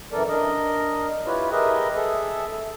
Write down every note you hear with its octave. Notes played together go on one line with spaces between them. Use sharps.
F#2 E3 A4 A#4 D5
D4 A#4 D#5
E4 F4 G4 B4 C#5
G4 G#4 A#4 B4 D#5 E5
G#4 A4 E5